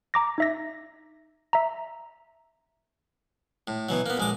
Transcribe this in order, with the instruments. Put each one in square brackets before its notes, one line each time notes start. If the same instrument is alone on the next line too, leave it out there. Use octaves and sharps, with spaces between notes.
[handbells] A#5 D6 A#6
D#4 E5 A#6
E5 A#5
[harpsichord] A2
B2 E3 F#3
A#3 B3
A#1 G#3 D6